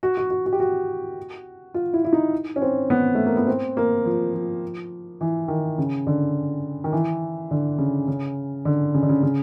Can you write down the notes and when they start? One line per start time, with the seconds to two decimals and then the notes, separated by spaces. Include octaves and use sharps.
0.03 F#4
0.17 F#4
0.30 F#4
0.46 F#4
0.53 G4
0.60 F#4
1.74 F4
1.93 E4
2.05 E4
2.13 D#4
2.56 C#4
2.62 C4
2.90 B3
3.15 A3
3.26 A#3
3.37 B3
3.47 C4
3.77 A#3
4.05 F3
4.34 F3
5.21 E3
5.48 D#3
5.78 C#3
6.07 D3
6.84 D#3
6.92 E3
7.51 D3
7.78 C#3
8.08 C#3
8.65 D3
8.94 C#3
9.02 D3
9.09 C#3
9.23 C#3